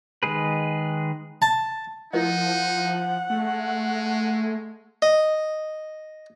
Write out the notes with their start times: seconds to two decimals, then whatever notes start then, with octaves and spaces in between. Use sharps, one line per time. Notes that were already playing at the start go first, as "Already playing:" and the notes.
0.23 D#3 G#3 G#4 B4
1.42 A5
2.13 F3 D#4 E4 A#4 D#5 F#5
3.30 G#3 A3
5.02 D#5